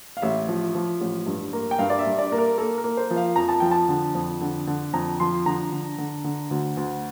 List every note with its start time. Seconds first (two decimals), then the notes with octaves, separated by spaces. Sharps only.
0.17 F5
0.22 A1 E5
0.48 F3
0.75 F3
1.01 A1
1.27 G2
1.53 A#3
1.71 G5
1.79 G2 F5
1.90 D5
1.99 E5
2.06 G2
2.18 D5
2.32 A#3
2.38 A#4
2.58 A#3 A4
2.78 A#4
2.84 A#3
2.97 C5
3.10 F3
3.16 F5
3.36 F2 A#5
3.48 A5
3.60 F3 G5
3.71 A5
3.88 D3
4.15 F2
4.41 D3
4.67 D3
4.93 F2 A#5
5.20 F3 C6
5.46 D3 A#5
5.72 D3
5.98 D3
6.24 D3
6.51 D2
6.77 D2